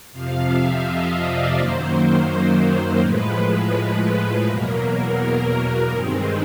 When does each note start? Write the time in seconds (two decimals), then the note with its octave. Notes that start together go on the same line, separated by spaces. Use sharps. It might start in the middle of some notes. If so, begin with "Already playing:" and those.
0.12 F2 C3 F3 F5
0.48 E5
0.84 D#5
1.20 D5
1.56 F#2 D#3 F#3 A#3 C5
3.00 A2 F3 G#3 B4
4.45 E2 B2 F#3 A#3 A#4
5.89 G2 D#3 G#3 C4